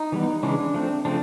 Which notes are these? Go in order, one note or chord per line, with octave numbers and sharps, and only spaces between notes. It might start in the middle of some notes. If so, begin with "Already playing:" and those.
Already playing: D#4
E3 G3 B3
C#3 E3 G#3 C#4 D4
F3 A3 C4
C#3 F3 A3 C4 D4